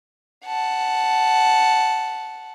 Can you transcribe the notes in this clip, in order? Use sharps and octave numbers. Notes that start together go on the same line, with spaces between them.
F#5 A5